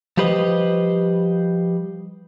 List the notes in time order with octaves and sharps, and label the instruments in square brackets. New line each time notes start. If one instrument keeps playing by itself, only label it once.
[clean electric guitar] F3 G3 G4 B4 C5 D#5